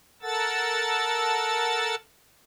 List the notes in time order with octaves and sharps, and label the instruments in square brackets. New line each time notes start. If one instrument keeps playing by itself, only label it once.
[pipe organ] A4 A#4 F#5 A5 E6 A6